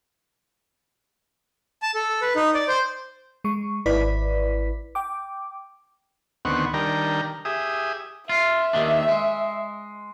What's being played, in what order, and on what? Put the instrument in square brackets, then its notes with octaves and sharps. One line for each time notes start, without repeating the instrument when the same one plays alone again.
[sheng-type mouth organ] A5
A4
B4
D#4
D5
C5
[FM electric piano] G#3 C#6
G#1 E4 B4 D5 B6
G5 D6
[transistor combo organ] D2 D#3 B3 C4 F#5 C#6
D#3 G3 D4 A#4 G5 A#5
G4 G#4 E5 D#6
[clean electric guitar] F4 [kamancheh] E5
[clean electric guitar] D#2 D#3 D4
G#3